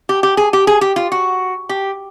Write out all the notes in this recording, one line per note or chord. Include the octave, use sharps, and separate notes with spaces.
G4
G4
G#4
G4
G#4
G4
F4
F#4
G4